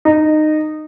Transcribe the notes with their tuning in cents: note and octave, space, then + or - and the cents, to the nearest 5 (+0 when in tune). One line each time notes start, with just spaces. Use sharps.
D#4 -20